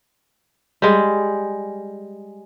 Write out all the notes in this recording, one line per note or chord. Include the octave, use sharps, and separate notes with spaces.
G3 G#3